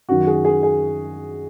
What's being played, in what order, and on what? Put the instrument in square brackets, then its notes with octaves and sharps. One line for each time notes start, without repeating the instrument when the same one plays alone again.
[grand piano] F#2 D#3 F#4
G#4
G#4
G#4